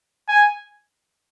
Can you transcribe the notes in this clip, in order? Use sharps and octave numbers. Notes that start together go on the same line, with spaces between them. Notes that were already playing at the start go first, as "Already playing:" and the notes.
G#5